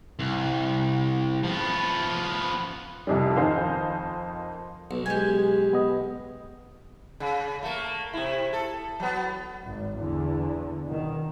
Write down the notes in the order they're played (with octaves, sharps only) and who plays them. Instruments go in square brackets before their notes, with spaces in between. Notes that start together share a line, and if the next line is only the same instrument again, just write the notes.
[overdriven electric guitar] C2
F3 B3
[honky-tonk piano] C2 F2 G3
F2 D#3 D#4 C5 F5 G#5
[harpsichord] B1 [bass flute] B3
[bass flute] G#3 [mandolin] G4 G#5
[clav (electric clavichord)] B3 D#5
[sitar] C#3
A3 A#3
C3 E4
A4
F#3 B3
[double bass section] G#1
E2 D3
B2 D#3